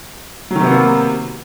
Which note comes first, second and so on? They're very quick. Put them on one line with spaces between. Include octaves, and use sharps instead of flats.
F#3 D#3 C3 B3 A#3